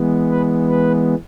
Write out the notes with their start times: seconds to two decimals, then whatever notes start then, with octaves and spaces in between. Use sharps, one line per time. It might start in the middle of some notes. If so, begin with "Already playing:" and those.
Already playing: E3 G#3 B3
0.30 B4
0.69 B4